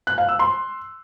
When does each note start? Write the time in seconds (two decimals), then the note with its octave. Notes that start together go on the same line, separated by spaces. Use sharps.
0.07 F#6
0.18 F5
0.29 E6
0.39 C6